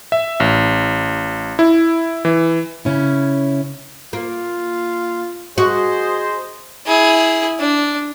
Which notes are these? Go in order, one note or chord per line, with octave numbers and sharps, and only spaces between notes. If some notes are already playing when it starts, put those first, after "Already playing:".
E5
A1
E4
E3
C#3 C#4 E4
A#3 F4
F#4 G#4 C5 D#5
E4 G#4
D4